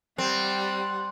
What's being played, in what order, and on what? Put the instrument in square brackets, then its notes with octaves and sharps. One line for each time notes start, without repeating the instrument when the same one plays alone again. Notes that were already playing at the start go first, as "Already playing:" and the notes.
[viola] G3 F#5 [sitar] C4